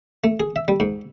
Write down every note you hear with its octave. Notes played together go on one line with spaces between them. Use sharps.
A3
G#4
E5
G3
G#2